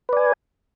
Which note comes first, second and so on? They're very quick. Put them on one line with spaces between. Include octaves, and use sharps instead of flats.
B4 D5 G#5